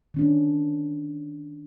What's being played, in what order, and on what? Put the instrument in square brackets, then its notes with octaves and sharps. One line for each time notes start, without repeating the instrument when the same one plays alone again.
[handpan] D#3 C#4 D4